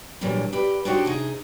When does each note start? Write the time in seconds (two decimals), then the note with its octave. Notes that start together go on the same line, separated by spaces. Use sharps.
0.21 A#2 D3 E3 F#3 G3
0.53 G4 B4 D5
0.85 D4 D#4 F#4 G4 C5 C#5
1.05 C3 D#4 G#4